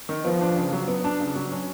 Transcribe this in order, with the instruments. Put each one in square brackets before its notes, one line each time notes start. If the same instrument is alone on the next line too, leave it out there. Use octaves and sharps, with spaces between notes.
[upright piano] D#3
[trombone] F3 [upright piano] B3
[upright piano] D4
C#3
F#3
B3
D4
C#3
F#3
C#4